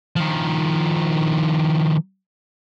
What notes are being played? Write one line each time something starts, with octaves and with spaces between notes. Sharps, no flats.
D#3 F3